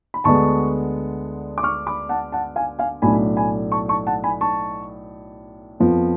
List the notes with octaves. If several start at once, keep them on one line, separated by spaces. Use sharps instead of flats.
B5
D2 D3 G#3 B3 A5 C#6
D6
C#6 F6
B5 D6
F#5 A5
F#5 A5
F5 G#5
F5 G#5
B1 A2 F#3 A3 D4 G#5 B5
G#5 B5
A5 C#6
A5 C#6
F#5 A5
G#5 B5
A5 C#6
F2 F3 B3